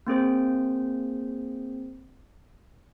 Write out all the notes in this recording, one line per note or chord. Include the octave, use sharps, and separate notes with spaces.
A#3 C4 G#4 C5